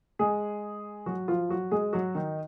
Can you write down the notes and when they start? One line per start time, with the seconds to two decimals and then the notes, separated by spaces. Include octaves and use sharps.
0.19 G#3 G#4
1.06 F#3 F#4
1.28 F3 F4
1.49 F#3 F#4
1.71 G#3 G#4
1.93 F#3 F#4
2.15 D#3 D#4